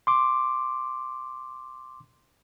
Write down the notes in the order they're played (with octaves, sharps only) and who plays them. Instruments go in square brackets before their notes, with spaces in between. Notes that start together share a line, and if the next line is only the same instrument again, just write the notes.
[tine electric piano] C6 D6